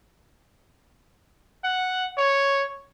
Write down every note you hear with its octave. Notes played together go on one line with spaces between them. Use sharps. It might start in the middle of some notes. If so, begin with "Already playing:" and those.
F#5
C#5